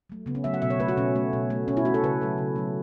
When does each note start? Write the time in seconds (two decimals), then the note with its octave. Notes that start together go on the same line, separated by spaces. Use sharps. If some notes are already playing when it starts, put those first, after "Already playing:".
0.10 F#3 A3
0.26 C#3 B3
0.35 C#4
0.44 F#3 A3 E5
0.54 F#5
0.62 B2 E5
0.70 C#5
0.80 A3 B4
0.89 F#4
0.97 B2 C#4
1.16 A3
1.33 B2
1.50 A3
1.68 B2 C#4
1.77 E4
1.85 A3 F#4
1.94 A4
2.03 C#3 B4
2.21 F#3 A3
2.38 C#3
2.56 F#3 A3